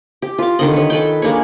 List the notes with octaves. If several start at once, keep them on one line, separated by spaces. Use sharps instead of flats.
G4
F4 D6
D3 D#3 D#5
B4 C#5
A4 B4 G5
G#3 A#3 D4 C#5